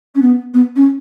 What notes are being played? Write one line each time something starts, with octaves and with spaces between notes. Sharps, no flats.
C#4
B3
B3
C#4